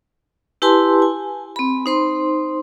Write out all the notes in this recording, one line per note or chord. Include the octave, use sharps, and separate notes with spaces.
E4 G4 B4 G#5 A5 C6
G#5
C4 B5
D#4 C5 C6